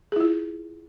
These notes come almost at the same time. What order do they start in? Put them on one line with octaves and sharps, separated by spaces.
G#4 E4 F4